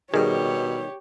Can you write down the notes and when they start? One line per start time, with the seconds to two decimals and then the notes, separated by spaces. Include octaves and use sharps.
0.14 B2 D#3 G3 G4 G#4 C#5